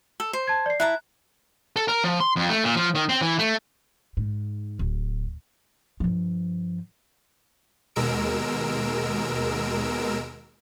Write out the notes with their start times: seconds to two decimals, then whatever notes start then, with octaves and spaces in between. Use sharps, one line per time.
0.20 A4
0.33 C5
0.47 A5 G#6
0.66 D5 C7
0.80 E4 A5 A#5 F#6
1.76 A4
1.88 A#4
2.04 F3
2.20 C6
2.36 F2
2.49 A3
2.64 A#2
2.76 F3
2.95 D#3
3.09 C4
3.21 E3
3.39 A3
4.17 G#2
4.79 D1
6.00 G2 F3
7.96 D#2 B2 G#3 A#4 E6 D7